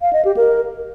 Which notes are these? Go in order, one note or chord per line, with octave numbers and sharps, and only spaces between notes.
F5
D#5
G4
A#4